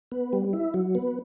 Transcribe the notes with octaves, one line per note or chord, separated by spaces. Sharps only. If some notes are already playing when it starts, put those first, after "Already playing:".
B3
G3
E4
F#3
B3